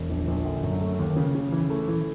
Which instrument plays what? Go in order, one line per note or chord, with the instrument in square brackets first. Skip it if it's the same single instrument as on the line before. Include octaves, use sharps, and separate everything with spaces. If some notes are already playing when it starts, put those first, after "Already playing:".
Already playing: [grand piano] E1
A#1
A#1
D3
F#2
A3
D#2
C#3
C#3
E3
A3
E3